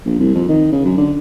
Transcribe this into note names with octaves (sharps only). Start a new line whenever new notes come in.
A#1
C2
F2
D#3
C#3
F#2
D3